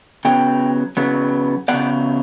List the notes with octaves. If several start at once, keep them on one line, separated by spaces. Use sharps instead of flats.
C#3 F#3 B3 G5
C#3 F#3 B3
C#3 F#3 B3 D5 F#5